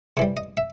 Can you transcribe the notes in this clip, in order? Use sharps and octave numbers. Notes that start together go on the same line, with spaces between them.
C3 E3 G3 C#5
D#5
E5